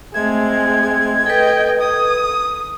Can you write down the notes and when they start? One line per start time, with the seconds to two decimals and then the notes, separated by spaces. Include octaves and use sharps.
0.14 G#3 A3 C4 E5 G#6
1.26 A4 B4 D#5 G5
1.81 D#6